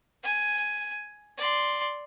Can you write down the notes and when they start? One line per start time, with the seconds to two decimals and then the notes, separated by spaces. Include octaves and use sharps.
0.23 G#5
1.37 D5 C6